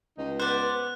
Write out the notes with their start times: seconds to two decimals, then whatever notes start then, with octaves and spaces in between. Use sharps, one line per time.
0.18 C#2 D#4
0.40 B3 C5 D5 F#6